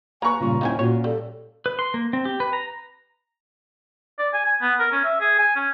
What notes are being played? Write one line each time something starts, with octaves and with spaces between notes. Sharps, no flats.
A#3 B4 G#5 A#5 C#6
G2 A#2 C#3 F4
D#2 D#3 C4 C#4 E4 G#5
A#2 C#4 F4 F#4 C#5
G3 A4
B4
C6
A#3
C4
G4
B4
A#5
D5
G#5
G#5
B3
A#4
C#4
E5
G#4
G#5
C#4